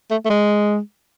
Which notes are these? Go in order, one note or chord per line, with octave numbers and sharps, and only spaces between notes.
A3
A3
G#3